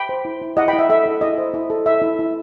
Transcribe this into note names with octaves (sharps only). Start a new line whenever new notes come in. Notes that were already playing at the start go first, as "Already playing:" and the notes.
Already playing: G5 B5
C5
E4
E4
E4 D#5 F#5
G5 B5
E4
E5
A4 E5
E4
E4 D#5
C5
E4
A4
E4 E5
E4
E4